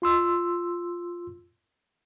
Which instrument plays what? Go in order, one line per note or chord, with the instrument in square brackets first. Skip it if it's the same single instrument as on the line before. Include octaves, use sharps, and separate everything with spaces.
[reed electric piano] F4 C6 E6